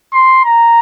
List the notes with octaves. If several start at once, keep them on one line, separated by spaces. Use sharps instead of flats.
C6
A#5